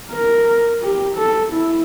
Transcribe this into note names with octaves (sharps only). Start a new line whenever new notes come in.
A#4
G4
A4
E4